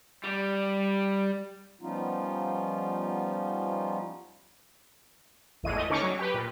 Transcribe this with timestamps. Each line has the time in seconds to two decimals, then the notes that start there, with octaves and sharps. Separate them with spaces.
0.24 G3
1.81 F3 G3 B3 C#4 D#4 F4
5.63 G#1 E2 A2 G#3 D#7
5.75 A3 D#5
5.90 D3 C#4 D#4 C#6 D6
6.03 F#3
6.19 G4 B4
6.34 A#2